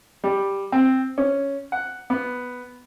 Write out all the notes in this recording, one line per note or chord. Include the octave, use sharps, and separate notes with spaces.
G3
C4
C#4
F#5
B3